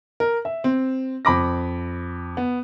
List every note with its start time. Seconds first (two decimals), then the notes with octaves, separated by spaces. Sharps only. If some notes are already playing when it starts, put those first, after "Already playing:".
0.20 A#4
0.45 E5
0.64 C4
1.25 F2 B5 D6 A#6
2.37 B3